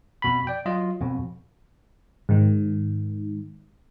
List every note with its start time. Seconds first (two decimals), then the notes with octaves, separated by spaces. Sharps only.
0.22 F2 B2 B5
0.47 D5 G5
0.66 F#3 F4 D#5
1.00 F2 B2
2.29 G#2 D#3